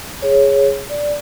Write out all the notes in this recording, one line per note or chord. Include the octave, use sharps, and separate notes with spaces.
G#4 C#5
D5